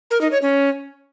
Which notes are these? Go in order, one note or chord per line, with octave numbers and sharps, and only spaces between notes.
A#4
D#4
C#5
C#4